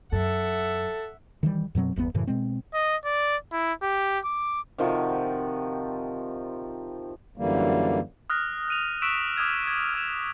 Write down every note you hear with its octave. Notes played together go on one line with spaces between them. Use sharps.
F#2 A4 E5 F#5
D#3 E3 G3
F#2 B2 F#3 C4
G1 E2 D3 B3
F#2 A2 C#3 E3
B2 G#3 C4
D#5
D5
E4
G4
D6
C3 D#3 F3 F#4
F#2 D3 E3 G3 A#3
D#6 F6 F#6 A#6
F#6 D#7 F7
C#6 E6 F#6 B6 D7 E7
D6 D#6 F6 G#6 F7
G#6
F6 G#6 E7 F7